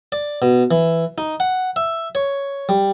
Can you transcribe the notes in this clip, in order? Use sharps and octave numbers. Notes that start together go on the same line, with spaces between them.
D5
B2
E3
D#4
F#5
E5
C#5
G3